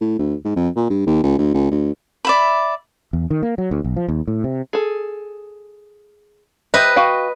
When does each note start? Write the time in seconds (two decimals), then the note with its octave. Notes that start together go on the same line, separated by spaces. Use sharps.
0.01 A2
0.19 D2
0.45 G#2
0.56 F2
0.76 A#2
0.90 G2
1.06 D#2
1.23 C#2
1.39 D2
1.54 C#2
1.71 D2
2.25 D5 E5 B5
3.13 E2
3.30 D#3
3.43 A#3
3.58 F#3
3.71 D2
3.84 B1
3.96 F3
4.08 D#2
4.28 A2
4.44 C3
4.73 G#4 A4
6.74 G4 B4 C5 D#5 E5
6.96 F#4 F5 G5